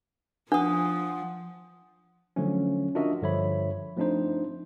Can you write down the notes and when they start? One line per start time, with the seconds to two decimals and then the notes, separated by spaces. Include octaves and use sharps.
0.52 F3 D4 F#5 D#6
2.36 D3 F3 F#3 A3 C#4
2.95 D4 F4 F#4 A#4 D#5 E5
3.22 G2 D3 F3 C#5 E5 B5
3.97 F3 A3 C4 D4 D#4 C5